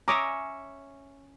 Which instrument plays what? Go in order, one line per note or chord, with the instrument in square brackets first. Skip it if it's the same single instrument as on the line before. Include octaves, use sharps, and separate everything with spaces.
[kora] C#4 C#5 E5 [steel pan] A#5 D6 D#6